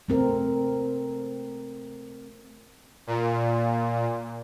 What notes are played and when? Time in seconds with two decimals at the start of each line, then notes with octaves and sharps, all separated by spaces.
0.09 A3 C4 A#4
3.07 A#2